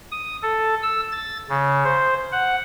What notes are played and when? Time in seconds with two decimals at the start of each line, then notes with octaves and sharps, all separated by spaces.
0.12 D#6
0.43 A4
0.83 E6
1.12 A6
1.49 C#3
1.84 C5
2.32 F#5